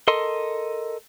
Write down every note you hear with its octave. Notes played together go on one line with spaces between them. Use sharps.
A4 A#4 D#5 C6